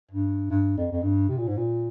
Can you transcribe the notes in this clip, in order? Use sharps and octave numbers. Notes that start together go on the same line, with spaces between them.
G2
G2
F2
F2
G2
C3
A#2
G#2
A#2